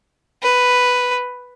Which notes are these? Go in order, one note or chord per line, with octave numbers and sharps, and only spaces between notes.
B4